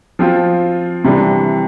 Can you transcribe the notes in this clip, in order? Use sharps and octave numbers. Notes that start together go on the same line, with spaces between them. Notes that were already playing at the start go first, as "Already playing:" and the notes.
F3 C4 F4
C3 E3 G3 D4